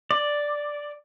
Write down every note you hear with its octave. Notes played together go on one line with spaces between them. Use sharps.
D5